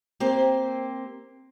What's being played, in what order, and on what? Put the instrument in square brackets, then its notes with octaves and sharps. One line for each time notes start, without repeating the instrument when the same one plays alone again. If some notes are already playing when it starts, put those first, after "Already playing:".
[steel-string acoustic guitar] A#3 C4 G4 C5